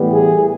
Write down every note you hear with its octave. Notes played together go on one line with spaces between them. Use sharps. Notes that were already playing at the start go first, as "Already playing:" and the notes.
Already playing: A2 E3 G3 B3
G#4